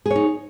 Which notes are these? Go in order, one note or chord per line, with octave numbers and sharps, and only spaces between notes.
D#4 G#4 C#5